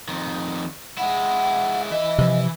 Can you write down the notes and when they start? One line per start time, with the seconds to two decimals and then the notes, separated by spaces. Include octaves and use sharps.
0.08 F2 D#3
0.98 G#3 E4 F#5
1.91 E3 D#5 E5
2.18 C3 F3